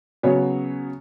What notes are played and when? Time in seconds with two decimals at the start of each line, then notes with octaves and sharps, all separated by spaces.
0.23 C#3 F#3 B3 F#4 C#5